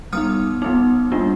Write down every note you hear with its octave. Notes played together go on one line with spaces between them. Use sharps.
G3 B3 D#4 D#6 F6
G3 B3 D#4
G3 A#3 D4 F4